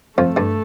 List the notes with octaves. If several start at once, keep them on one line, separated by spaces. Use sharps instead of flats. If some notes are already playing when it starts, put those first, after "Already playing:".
F2 F3 A3
G2 G3